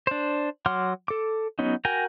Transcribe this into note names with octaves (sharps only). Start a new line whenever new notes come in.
D4 C5
F#3 F#5 C6 D6 F6
A4 D6
F#3 B3 C#4 D#4
F#4 A#4 G5 G#5 A#5